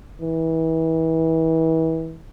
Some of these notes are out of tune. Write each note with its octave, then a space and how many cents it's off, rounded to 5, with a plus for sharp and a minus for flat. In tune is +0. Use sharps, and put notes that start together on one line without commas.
E3 -30